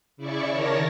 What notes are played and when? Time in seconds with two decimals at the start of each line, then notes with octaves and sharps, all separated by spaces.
0.17 C#3 E4 D5 C#6
0.50 D#3 A#4 C#5 A5 A#6